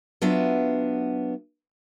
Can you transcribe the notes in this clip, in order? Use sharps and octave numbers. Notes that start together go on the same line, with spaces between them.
F#3 B3 D4 F4 E5